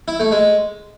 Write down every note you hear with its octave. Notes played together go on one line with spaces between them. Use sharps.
E4
A3
G#3